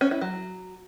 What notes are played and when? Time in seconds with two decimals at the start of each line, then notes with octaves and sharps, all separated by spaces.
0.01 C#4
0.11 E4
0.21 F#3